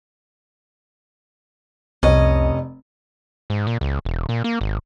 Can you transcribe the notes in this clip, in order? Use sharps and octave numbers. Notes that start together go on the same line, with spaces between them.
F1 C2 C#4 D#5
G#2
A#2
C#2
E1
A#2
A#3
G#1